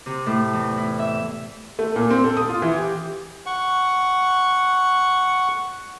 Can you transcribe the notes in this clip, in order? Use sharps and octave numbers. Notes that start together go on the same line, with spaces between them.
C3
A2
E2
E4
E5
A3
A#2
C4
A4
D#6
F4
E3
G4
F#5 C#6